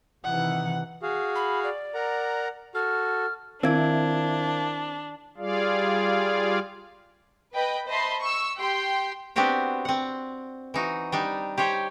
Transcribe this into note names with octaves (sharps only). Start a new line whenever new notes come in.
C3 D#3 E3 F#5
F#4 G#4 F5
B5
D5
A#4 F#5 A#5
F#4 A4 F6
D#3 C4 D4 E4 A#4 F5 G#6
G3 F4 G#4 D5 F5
B4 D#5 G5 B5
C5 D#5 E5 A5 B5 C6
C#6 E6
G4 G5 C6
B3 C4 D4 F#4 G4 C5
C4 F#5
E3 D#4 F#4
G3 D4 D#4
G4 C5 C#5 G5